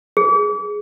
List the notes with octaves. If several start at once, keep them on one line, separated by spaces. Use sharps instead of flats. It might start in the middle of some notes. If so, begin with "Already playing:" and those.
G#4